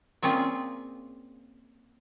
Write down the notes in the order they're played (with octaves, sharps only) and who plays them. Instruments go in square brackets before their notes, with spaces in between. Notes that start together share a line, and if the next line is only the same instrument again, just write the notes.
[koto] A#2 C4 C#4 F4 G#4